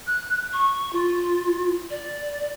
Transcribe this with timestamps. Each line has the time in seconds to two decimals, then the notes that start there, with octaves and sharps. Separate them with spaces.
0.07 F#6
0.53 C#6
0.93 F4
1.90 D5